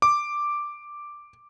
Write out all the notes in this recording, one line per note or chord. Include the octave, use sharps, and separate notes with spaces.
D6